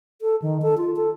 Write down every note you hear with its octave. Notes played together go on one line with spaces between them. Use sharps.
A4
D#3
A4
F4
A4